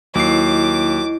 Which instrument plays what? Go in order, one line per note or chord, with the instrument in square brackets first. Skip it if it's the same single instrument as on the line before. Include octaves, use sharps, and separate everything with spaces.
[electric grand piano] D#2 C7 [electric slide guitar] F#3 [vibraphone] E4 D#5 [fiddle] D6